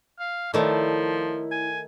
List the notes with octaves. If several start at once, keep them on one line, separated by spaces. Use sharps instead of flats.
F5
D#3 F3 A3 E4 C#5 D5
G#5